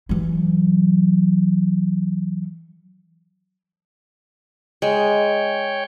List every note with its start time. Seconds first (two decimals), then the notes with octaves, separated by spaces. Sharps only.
0.09 E3 F#3
4.82 G#3 C#5 G5